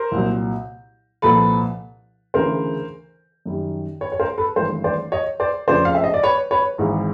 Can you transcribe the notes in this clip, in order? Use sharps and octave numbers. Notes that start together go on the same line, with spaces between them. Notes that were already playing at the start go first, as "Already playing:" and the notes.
Already playing: A#4 C5
C2 A#2 F#3
C2 A#2 F3 A4 B4
D2 C#3 E3 A#4 C5
F#2 D#3 G3
B4 C#5
C#5
A#4 C5
A4 B4
G#1 G2 E3 A3 A#4 C5
C5 D5
C#5 D#5
C5 D5
F1 F2 C#3 F3 C5 D5
F5
E5
D#5
D5
B4 C#5
B4 C#5
G#1 G#2 E3